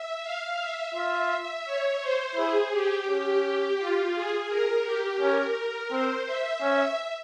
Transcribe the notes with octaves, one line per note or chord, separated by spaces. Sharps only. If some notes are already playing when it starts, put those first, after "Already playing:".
Already playing: E5
F5
E5
F4
C#5
C5
E4 G#4
G4
C#4
F4
G#4
A#4
G4
C#4 A#4
C4 C5
E5
C#4 E5